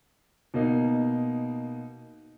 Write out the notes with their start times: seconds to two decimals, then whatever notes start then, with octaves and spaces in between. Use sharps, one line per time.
0.54 B2 A#3 D#4